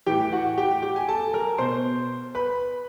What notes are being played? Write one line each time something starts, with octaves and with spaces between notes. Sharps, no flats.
A2 E3 G4 G5
F#4 F#5
G4 G5
G4 G5
G#5
A4 A5
A#4 A#5
B2 C5 C6
B4 B5